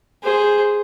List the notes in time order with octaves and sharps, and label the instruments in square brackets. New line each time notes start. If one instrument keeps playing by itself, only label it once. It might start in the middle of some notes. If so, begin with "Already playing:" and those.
[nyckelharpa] G#4 C5